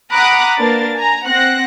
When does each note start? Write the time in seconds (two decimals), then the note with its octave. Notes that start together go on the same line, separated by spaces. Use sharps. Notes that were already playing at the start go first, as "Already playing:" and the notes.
0.12 F#5 A#5 B5 D6 D#6 F#6
0.58 A#3 D4 B4 A6
0.95 G#5 A#5
1.25 C4 F#5 F#6 A#6